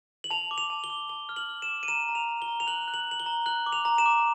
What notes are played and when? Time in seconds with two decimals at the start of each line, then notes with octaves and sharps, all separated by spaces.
0.24 F#7
0.30 A5 F7
0.51 D6
0.58 F7
0.70 A5
0.84 G7
0.90 D6
1.09 A5 G7
1.29 F6
1.36 F#7
1.49 F6
1.62 E7
1.69 D6
1.83 D#7
1.88 A#5 E7
2.09 A#5
2.15 F7
2.28 A#5
2.42 G7
2.48 A#5
2.60 F7
2.67 F#6 F#7
2.88 F#6
2.94 F#7
3.07 A#5 F#7
3.20 G7
3.26 A#5
3.46 F#6 F#7
3.66 D6
3.72 F7
3.85 A#5
3.98 E7
4.06 D6